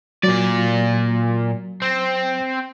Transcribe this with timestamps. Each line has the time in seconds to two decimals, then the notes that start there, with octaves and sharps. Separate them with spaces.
0.23 A#2 F#3 D5
1.82 C4